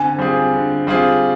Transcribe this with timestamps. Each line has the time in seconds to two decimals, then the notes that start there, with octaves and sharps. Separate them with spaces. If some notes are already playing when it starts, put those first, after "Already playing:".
Already playing: D3 G#5
0.18 G3 C4 F4 G#4
0.53 D3
0.87 G3 C4 F4 G#4